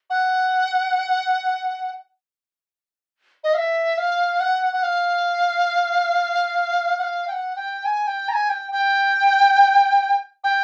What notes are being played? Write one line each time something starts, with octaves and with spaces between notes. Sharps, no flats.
F#5
D#5
F5
E5
F5
F#5
F#5
F5
F#5
F5
G5
F#5
G5
G#5
G5
A#5
G#5
G5
G5
G5